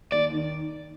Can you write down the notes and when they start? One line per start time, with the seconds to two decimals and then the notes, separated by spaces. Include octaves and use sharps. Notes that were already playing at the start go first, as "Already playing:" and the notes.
0.12 D#2 D5
0.31 D#3